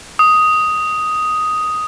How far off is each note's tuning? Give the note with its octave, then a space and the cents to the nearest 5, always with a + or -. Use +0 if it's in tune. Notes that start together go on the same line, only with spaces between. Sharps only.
D#6 +5